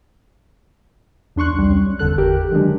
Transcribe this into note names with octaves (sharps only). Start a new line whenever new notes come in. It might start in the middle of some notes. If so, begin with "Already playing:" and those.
E2 D4 C6 C#6 F#6
C2 G3
C#4
G1 E2 D3 A4 F#6
G4 A#4
D3 D#3 F#3 G#3 D4